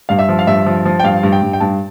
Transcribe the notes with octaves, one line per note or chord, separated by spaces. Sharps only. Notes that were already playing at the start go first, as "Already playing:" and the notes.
G2 F5
E5
F3
F5
G2 E5
F3
F3
G5
G2 F5
G2
G5
G2
G5
G2 A5